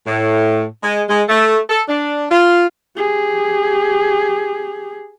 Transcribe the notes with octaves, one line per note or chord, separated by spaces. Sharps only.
A2
G#3
G#3
A3
A4
D4
F4
G4 G#4